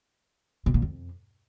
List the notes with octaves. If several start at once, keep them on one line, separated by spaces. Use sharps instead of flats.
B2
A#2
F2